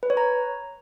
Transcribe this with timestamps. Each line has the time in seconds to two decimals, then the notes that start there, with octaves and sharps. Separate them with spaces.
0.03 B4
0.10 C#5
0.17 A#5